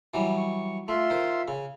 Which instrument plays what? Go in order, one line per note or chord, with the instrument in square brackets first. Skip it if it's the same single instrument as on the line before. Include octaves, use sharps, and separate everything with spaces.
[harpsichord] E3 F#3 G3
[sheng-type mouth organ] C#6
[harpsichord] A3 [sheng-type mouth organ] F4 E5 C6
[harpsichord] D#3 C5
C#3